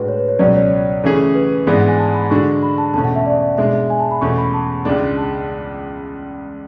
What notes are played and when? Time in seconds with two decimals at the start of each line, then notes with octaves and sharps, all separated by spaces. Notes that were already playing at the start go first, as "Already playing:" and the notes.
Already playing: A2 G#3 D4 F#4 B4
0.08 C#5
0.19 B4
0.28 C#5
0.39 C#2 B2 F#3 C#4 D5
0.55 C#5
1.04 C#3 E3 A3 C#4 G#4
1.35 B4
1.67 G#2 E3 G#3 B3 D4 D5
1.77 F#5
1.88 G#5
1.99 A5
2.14 B5
2.30 D3 G#3 D4 F#4 C#6
2.63 B5
2.78 A5
2.94 E2 B2 A3 C#4 A5
3.04 F#5
3.15 E5
3.26 D5
3.57 B2 G#3 D4 E5
3.90 G#5
4.00 A5
4.11 B5
4.21 E2 B2 A3 C#4 C#6
4.38 B5
4.53 A5
4.85 C#2 C#3 G#3 D4
5.17 A5